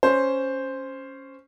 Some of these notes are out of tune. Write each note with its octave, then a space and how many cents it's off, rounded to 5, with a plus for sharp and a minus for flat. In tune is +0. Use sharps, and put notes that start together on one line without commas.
C#4 +0 C5 +0